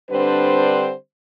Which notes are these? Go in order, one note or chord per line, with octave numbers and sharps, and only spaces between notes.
D3 G3 C4 D4 B4 C5